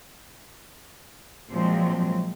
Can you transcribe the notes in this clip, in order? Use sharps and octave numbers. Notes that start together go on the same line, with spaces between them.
A#2 F3 F#3 G#3 C4